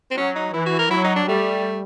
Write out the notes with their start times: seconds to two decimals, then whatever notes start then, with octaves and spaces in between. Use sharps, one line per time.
0.11 C4
0.17 F#3 C#4
0.36 D#4
0.54 E3 E4
0.66 F#4
0.79 A#4
0.91 F#3 E4
1.04 D#4
1.16 D4
1.28 G3 A3